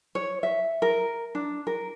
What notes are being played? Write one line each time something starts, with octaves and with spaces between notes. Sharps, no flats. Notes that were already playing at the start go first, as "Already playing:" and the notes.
C#5
E5
A#4
D4
A#4